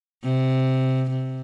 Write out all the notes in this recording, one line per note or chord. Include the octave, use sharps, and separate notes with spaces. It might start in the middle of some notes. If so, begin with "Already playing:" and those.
C3
C3